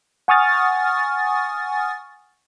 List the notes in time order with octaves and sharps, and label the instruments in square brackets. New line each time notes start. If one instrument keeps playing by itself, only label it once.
[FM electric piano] F#5 G#5 C#6 D#6 F6 A6